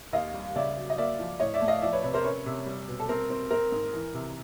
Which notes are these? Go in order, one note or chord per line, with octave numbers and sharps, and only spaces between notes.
D#2 D#5 F5
G3
C#3 D5 E5
F#3
D#5
A#3 D5 E5
F3
A2 C#5 D#5
D5 E5
A3
D#5 F5
F3 D5 E5
B4 C#5
C3 B4 C#5
A#4 C5
C#4 B4 C#5
C3
G3
B2
A4
C4 A#4
C4
C4 A#4
G#2
E3
C3